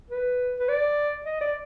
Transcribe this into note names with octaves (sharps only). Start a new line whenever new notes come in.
B4
B4
D5
D#5
D5